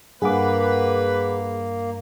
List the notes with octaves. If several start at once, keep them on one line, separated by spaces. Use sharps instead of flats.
G2 A#3 G#4 A#4 B4 F#5 D6